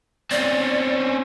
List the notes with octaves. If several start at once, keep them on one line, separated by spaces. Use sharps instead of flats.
C4 C#4 D5